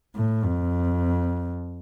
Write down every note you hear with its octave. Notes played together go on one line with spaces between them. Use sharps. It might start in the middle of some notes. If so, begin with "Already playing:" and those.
A2
F2